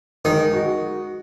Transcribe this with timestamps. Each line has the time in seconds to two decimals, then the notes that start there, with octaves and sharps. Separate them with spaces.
0.24 D#3 G#3
0.54 F#4